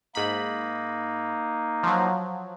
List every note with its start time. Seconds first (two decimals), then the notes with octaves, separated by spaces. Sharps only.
0.15 G#2 A#3 D#4 B5
1.83 F3 F#3